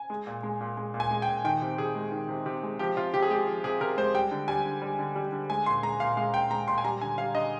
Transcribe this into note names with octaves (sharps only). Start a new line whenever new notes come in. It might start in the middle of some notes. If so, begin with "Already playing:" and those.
Already playing: G#5
G#3
A#2
G#3
A#2
G#3
A#2
G#5
G#3
G5
A#2
D#3 G5
C3
C3 G#4
G#3
D#3
C3
C3
G#3
F3 G4
C3 F4
C3 G4
G#4
G#3 G4
F3
C3 G#4
C3 A#4
G#3 C5
G3 G5
D3
G3 G#5
D3
G3
D3
G3
D3
G#3 G#5
A#2 C6
G#3 A#5
A#2 F5
G#3 F5
A#2 G5
G#3 A#5
A#2 C6
G#5
G3 A#5
D3 G#5
G3 F5
D3 D#5